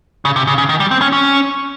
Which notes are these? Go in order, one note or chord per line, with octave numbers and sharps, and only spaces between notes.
C#3
C3
C#3
C#3
D#3
G3
C4
C#4
C#4